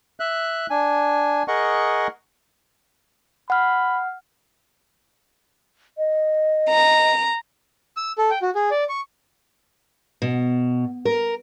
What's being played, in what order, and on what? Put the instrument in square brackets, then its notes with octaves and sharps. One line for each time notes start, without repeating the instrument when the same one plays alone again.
[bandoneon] E5 F#6
D4 G#5
G#4 A#4 D#5 F#5 C#6
[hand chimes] F#5 F6 [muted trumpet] B5
[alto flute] D#5
[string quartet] A#5
[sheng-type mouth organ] E6
A4
G5
F#4
G#4
D5
C#6
[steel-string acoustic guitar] B2
A#4